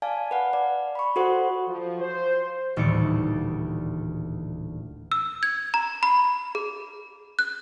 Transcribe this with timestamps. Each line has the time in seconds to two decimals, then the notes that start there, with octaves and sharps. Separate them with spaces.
0.02 D5 F5 G#5 A5
0.31 B4 F#5
0.53 D5
0.95 B5 C#6
1.16 F#4 A4 C5 F#5 C#6
1.67 F3
2.00 C5
2.76 D#1 D2 A2 E3 D5 C#7
5.12 E6
5.43 G#6
5.74 A#5
6.03 B5
6.55 G#4
7.39 F#6